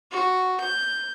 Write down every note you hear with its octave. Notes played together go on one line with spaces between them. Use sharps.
F#4
G6